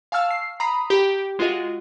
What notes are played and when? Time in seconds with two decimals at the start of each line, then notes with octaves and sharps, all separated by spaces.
0.12 F5 G#5 A5 C#6 E6 F6
0.31 C7
0.60 A#5 B5 D#6 C7
0.90 G4
1.39 G#3 F4 F#4 G#4 D#5